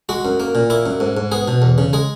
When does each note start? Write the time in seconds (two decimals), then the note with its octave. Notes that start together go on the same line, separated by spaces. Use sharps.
0.09 G#3 F#4
0.25 F#2
0.40 A#3
0.55 A#2
0.70 A#3 E4
0.86 F#2
1.00 G#2
1.17 G#2
1.32 B3 G#4
1.48 B2
1.62 E2
1.78 C#3
1.93 G#3 G#4